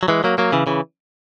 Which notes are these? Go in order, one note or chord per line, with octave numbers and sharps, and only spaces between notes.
F#3
E3 G#3
F#3 A#3
F#3 A#3
C#3 E3
C#3 E3